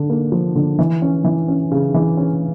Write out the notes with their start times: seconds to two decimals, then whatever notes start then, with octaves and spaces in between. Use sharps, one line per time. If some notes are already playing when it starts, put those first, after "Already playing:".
Already playing: D3
0.10 A#3
0.32 F3
0.55 D3
0.79 E3
1.02 C#4
1.24 E3
1.48 C#4
1.71 C#3
1.94 E3
2.17 C#4